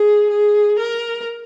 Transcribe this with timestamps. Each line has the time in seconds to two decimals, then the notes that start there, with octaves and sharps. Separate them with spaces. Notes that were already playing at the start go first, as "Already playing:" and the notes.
Already playing: G#4
0.31 G#4
0.79 A#4